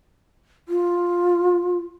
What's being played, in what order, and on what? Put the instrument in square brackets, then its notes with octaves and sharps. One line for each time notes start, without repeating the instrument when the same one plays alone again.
[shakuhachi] F4